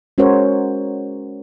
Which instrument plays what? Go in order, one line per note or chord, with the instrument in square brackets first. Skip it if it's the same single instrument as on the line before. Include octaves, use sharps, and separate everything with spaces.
[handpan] G#3 C#4 F#4 A#4 C5 C#5